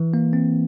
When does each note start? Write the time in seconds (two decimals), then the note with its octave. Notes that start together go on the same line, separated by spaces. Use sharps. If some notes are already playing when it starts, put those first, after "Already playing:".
Already playing: E3
0.14 A#3
0.33 C4